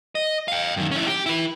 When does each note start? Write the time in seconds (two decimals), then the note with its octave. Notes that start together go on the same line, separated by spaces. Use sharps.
0.15 D#5
0.48 F5 G5
0.77 F#2 D#3
0.91 C#4 E4
1.07 G4
1.26 E4 B4